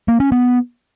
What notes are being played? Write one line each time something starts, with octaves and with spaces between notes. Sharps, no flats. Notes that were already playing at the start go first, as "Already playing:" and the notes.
A#3
C#4
B3